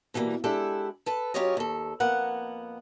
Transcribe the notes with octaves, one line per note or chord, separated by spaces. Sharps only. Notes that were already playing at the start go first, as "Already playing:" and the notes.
B2 E3 G3 G#3 A#3
G#3 D4 E4 G4 A4 E5
A4 B4 A5
F#3 C#4 F4 G4 C#5 D#5
D#2 A4
F2 A#3 B3 F#5